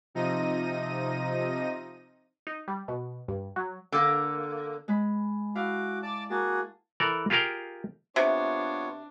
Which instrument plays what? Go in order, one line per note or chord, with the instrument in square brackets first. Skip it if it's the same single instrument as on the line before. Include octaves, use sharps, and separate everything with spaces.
[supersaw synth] C3 F3 D#4 A#6 D#7
[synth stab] D#4
G3
B2
G2
F#3
[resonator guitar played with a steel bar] D3 A#3
[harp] G#3 B5
[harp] E4 F5 [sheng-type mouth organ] F#4 D6
[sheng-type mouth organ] D5 A5 D6
[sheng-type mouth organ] A#3 F#4 G#4 [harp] A5
[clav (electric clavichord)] E3 A4 A#4 D5
F4 G4 G#4 A#4 F5 G5
[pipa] C3 [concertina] B3 F4 C#5 [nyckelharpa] D4